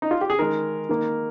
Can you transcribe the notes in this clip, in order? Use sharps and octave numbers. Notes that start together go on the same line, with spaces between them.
D#4
F4
G4
G#4
D#3 G#3 A#4
D#3 A#3